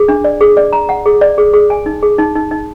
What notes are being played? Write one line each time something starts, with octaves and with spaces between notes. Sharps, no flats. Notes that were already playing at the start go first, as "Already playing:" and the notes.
Already playing: G#4
D4
D5
G#4
D5
A#5
F#5
G#4
D5
G#4
G#4
G#5
D#4
G#4
D#4
D#4
D#4